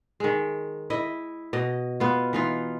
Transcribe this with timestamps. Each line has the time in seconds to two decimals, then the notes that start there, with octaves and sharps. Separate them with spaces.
0.20 D#3 G#3
0.90 E4 D#5
1.53 B2 D#5
2.00 B3 F4
2.33 E3 D#4 F4